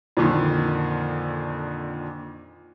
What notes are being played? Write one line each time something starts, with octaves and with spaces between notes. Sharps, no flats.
F2 A#2 D3 D#3